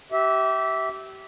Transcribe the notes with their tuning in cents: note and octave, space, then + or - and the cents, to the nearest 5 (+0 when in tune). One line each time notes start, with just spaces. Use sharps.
G4 -30 E5 -15